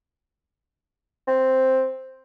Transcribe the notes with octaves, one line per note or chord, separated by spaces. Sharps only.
C4